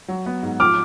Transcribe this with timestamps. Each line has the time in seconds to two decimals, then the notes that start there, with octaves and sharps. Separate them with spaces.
0.08 F#3
0.26 B3
0.43 G#2
0.60 F3 D6 F6